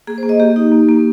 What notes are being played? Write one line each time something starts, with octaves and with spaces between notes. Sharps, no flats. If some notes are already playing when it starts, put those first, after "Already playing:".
A#3 G#4
A#3 C5
D#5
A#3 G4
D#4
A#3
A#3